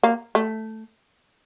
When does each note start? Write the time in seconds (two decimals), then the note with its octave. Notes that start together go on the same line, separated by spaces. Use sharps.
0.04 A#3
0.35 A3